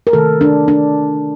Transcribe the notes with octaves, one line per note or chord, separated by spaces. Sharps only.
A#4
C3 D#3 A3 A4
D4
D4